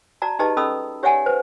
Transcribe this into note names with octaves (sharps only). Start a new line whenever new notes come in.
F#4 D5 A5 A#5
D#4 G4 G#4 B4 D#5 A5
C#4 A4 D#5 B5 D#6 E6
G4 C#5 D5 E5 F#5 G#5
B4 C5